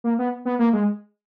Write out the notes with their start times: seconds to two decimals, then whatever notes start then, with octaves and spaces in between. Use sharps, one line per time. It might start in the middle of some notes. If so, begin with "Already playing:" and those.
0.04 A#3
0.19 B3
0.45 B3
0.59 A#3
0.73 G#3